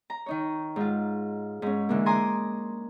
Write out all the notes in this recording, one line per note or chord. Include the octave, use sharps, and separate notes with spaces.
A#5
D#3 D#4 C#5
G#2 F4
G#2 C#4
D3 E3 G#3 A#3
G#5 A#5 C6 D6 D#6